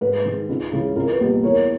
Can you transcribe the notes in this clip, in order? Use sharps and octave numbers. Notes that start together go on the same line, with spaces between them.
G#2 B4
D#3 G#3
C#2
C#3 E3 G#3
C#2 A#4
B4
B2 G3 A#3
E2 A#4 C#5